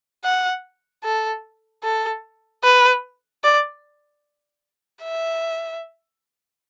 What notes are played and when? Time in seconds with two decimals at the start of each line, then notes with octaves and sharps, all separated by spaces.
0.24 F#5
1.04 A4
1.83 A4
2.63 B4
3.43 D5
5.03 E5